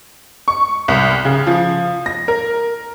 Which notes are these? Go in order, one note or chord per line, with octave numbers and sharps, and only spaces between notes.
C#6
C2
C#3
F3
A#6
A#4